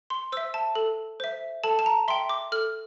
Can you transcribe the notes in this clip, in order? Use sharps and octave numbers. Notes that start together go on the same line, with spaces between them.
C6
C5 E5 E6
A5
A4
C5 E5
A4 A5
A5
A#5
E5 G5 C6
D6
A4 F6